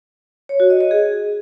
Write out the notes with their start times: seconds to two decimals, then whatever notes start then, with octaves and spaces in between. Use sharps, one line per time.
0.49 C#5
0.60 F#4
0.70 D#5
0.81 D#5
0.91 G#4